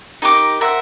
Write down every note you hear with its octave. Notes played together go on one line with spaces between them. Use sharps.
D#4 G4 A#4 D6
A#4 C5 E5 F#5